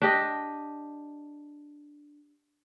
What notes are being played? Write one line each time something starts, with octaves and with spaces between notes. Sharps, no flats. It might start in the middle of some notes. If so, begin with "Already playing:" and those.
D4 G4 D#5